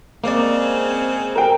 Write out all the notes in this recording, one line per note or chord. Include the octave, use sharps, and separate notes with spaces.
C#3 G#3 A#3 C4 D5
A#4 G5